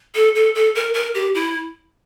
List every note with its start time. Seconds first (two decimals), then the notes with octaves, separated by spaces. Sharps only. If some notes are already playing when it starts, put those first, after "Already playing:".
0.15 A4
0.35 A4
0.55 A4
0.75 A#4
0.94 A#4
1.15 G4
1.35 E4